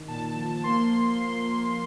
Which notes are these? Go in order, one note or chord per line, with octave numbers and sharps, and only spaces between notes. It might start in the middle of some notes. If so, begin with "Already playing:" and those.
Already playing: D#3
A#2 A5
F3
A#3 C6